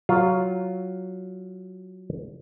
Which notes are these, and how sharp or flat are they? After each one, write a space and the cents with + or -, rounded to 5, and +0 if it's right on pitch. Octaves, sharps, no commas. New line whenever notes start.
F#3 +5 F4 +5